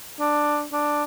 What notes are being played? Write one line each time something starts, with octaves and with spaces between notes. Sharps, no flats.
D4
D4